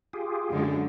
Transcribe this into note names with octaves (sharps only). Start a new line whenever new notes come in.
F4 G4 G#4
F#2 D3 G#3